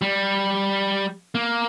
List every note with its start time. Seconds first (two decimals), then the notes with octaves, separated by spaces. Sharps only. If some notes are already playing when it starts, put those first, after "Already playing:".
0.02 G3
1.35 A#3